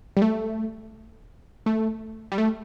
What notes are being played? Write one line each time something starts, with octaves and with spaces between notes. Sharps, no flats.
G3
A3
A3
G3
A3